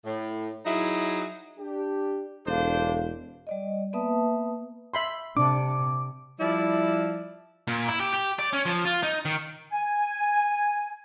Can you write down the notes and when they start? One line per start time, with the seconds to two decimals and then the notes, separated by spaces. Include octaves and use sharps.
0.05 A2
0.66 F#3 D#4 E4 G#4
1.59 D4 G4
2.46 E1 D4 A4 C5 F5
3.47 G3 D5 D#5
3.93 A#3 B3 B4 E5 A5 D#6
4.94 E5 B5 C6
5.37 C3 D4 D6
6.40 F3 G3 E4 D5
7.68 A#2
7.88 E4
8.00 G4
8.14 G4
8.39 D5
8.53 C#4
8.65 F3
8.85 F4
9.03 D#4
9.25 D#3
9.72 G#5